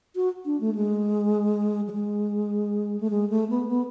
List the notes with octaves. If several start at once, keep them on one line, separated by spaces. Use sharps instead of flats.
F#4
D4
A3
G#3
F#3
G#3
A3
G#3
A3
B3
B3